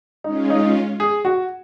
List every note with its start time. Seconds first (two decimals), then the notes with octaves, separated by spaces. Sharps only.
0.24 G#3 C#4 D#4 F4
0.50 D#4
1.00 G#4
1.25 F#4